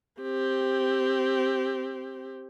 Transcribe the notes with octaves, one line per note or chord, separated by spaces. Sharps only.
C4 G4